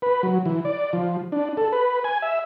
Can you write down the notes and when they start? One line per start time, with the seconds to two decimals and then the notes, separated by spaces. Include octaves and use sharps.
0.02 B4
0.23 F#3
0.46 E3
0.65 D5
0.93 F3
1.32 D4
1.57 A4
1.72 B4
2.04 G#5
2.22 E5